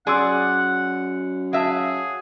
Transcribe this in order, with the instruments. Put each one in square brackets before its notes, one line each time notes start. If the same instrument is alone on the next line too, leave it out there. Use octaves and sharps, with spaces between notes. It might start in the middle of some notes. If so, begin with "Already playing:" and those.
[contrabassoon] F#2 [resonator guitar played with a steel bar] G#4 D5 [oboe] F#5 [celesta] G#5 C6 E6
[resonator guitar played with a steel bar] F#3 E5 [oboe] G#4 [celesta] F5 A5